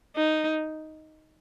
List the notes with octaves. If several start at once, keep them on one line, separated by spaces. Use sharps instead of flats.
D#4